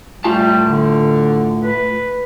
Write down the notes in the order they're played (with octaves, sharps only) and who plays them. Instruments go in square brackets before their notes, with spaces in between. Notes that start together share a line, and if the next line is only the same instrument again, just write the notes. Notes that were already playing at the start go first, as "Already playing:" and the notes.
[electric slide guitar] A2 F4 A5 [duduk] G3
[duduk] D3
B4